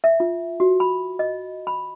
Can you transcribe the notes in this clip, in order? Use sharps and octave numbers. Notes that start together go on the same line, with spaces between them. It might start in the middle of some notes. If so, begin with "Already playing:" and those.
E5
F4
F#4
B5
D#5
B5